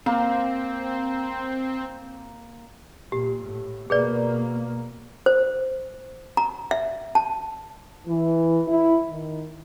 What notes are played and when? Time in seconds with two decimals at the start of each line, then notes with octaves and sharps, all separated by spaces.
0.06 A#3 C4
3.12 A#2 G4
3.43 A2
3.90 B2 A#3 G#4 B4 D5
5.26 C5
6.37 A#5
6.71 E5
7.15 A5
8.06 E3
8.68 E4
9.11 D#3